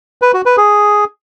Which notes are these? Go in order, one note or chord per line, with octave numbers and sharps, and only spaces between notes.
B4
F#4
B4
G#4